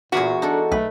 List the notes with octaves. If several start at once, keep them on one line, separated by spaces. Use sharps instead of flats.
E2 A#2 F#4 G#4 A#4 B4
D4 D#4 A4
B1 A3 B4